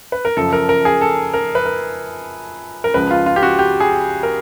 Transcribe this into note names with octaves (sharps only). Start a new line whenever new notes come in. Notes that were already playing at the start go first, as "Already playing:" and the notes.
B4
A#4
F#2 C#3 F3 A4
A#4
A#4
G#4
A4
A#4
B4
A#4
A#4
C#2 C#3 F3 B4
F4
F4
G4
F#4
G4
G#4
A#4